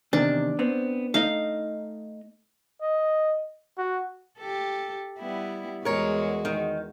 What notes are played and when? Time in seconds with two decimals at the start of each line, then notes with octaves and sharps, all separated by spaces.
0.13 E2 C3 D#3 D4
0.59 B3 C4
1.14 A3 D#4 D#5 F5
2.81 D#5
3.78 F#4
4.39 G4 A4
5.19 G3 B3 E4
5.85 E2 G#3 F#4 A#4 C#5
6.45 D#3